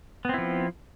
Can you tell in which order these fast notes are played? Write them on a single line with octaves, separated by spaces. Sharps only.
B3 C4 E4 F3